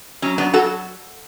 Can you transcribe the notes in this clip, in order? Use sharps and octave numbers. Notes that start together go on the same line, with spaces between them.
F#3 C#4
B3 D4
F#3 F#4 A4